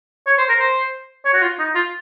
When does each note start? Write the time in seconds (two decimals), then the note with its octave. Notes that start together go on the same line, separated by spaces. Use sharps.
0.26 C#5
0.38 C5
0.49 A#4
0.60 C5
1.25 C#5
1.34 F#4
1.42 F4
1.59 D#4
1.75 F4